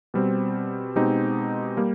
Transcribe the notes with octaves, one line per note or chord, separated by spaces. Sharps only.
B2 G3 C4
B2 G#3 C4 D#4 G4
G3 A#3